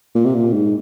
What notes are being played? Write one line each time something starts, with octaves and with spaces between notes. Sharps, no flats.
A#2
C3
A#2
G#2